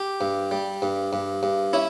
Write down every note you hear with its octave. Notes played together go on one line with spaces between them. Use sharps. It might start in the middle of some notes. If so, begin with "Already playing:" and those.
Already playing: G4
G2
G3
G2
G2
G2
C#4 E4